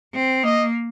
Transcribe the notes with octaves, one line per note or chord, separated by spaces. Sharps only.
C4
A#3 D#5